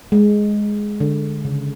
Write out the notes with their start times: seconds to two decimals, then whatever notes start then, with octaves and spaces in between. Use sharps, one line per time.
0.12 G#3
1.00 D3
1.45 C#3